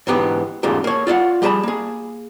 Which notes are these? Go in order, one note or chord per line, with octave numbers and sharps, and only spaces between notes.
G#2 D3 E3 B3 G4
E2 G#2 C#3 A3 F4 G4
A#3 C#5
F4 D5 E5 F#5
G3 G4 G#4 B4 A5 B5
A#3 G#4